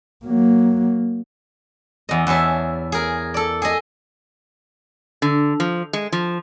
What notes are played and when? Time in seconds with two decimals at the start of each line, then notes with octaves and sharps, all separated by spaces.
0.25 F#3 A#3
2.09 E2 D#5
2.27 E2 G#4 C#5 E5 A5
2.92 G#4 A#4
3.34 A4 D5
3.62 G#4 D#5
5.22 D3
5.60 F3
5.93 G#3
6.12 F3